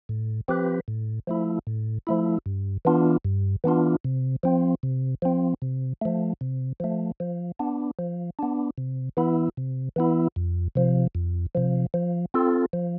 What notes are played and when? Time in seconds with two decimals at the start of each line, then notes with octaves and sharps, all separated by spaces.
0.09 A2
0.48 F3 C4 G4 B4
0.88 A2
1.27 F3 A3 E4
1.67 A2
2.07 F3 A3 E4
2.46 G2
2.85 E3 B3 D4 F4
3.25 G2
3.64 E3 B3 D4 F4
4.04 C3
4.43 F3 C4
4.83 C3
5.22 F3 C4
5.62 C3
6.01 F3 A3
6.41 C3
6.80 F3 A3
7.20 F3
7.59 B3 D4
7.99 F3
8.39 B3 D4
8.78 C3
9.17 E3 B3 E4
9.57 C3
9.96 E3 B3 E4
10.36 F2
10.75 C3 F3
11.15 F2
11.55 C3 F3
11.94 F3
12.34 C4 F4 A4
12.73 F3